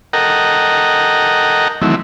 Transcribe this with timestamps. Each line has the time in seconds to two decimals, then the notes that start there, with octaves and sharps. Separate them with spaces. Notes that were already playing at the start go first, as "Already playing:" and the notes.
0.13 A4 A#4 D#5 F#5 G5 A#5
1.82 D#3 E3 F#3 A3 C4 E4